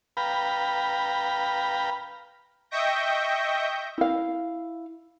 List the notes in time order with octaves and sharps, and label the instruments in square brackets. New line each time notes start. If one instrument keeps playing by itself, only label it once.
[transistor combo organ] B4 F5 G5 A#5 B5
[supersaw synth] D#5 E5 G5 C#6 G6 A#6
[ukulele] E4 F5